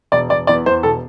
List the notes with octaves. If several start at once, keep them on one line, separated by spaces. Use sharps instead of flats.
E1 D5
E1 D5
E2 D5
E2 C5
E1 A4